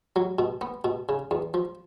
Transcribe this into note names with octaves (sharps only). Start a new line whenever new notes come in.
F#3
B2
B3
B2
C#3
E2
F3